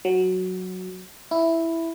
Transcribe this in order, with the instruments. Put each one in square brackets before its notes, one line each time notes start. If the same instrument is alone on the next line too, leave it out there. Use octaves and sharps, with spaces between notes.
[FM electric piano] F#3
E4